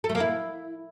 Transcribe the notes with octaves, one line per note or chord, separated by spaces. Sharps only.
A4
A3
A#3
E4